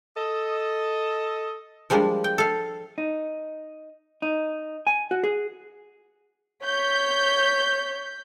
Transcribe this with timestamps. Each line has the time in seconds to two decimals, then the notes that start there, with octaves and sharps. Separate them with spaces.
0.16 A4 D#5
1.90 F3 G3 G#3 A#3 D4
2.24 G5
2.38 A4 F5
2.98 D#4
4.22 D#4
4.87 G#5
5.11 F#4
5.24 G#4
6.64 C#5 G6 B6